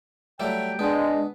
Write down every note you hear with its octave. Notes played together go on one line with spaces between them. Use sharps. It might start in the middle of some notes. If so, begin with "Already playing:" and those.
F#3 G3 A3 G5
G#3 B3 D4 D#6